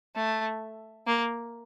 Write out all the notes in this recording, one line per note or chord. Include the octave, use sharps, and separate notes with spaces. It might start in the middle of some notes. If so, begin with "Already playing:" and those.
A3
A#3